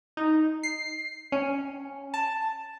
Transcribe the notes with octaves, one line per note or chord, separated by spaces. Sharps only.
D#4
C7
C#4
A5